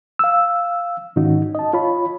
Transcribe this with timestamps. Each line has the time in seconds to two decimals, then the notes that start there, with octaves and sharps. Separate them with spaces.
0.19 F5 E6
1.16 G#2 D#3 C#4 D#4 F#4
1.55 D#5 A5
1.73 F4 C#5 B5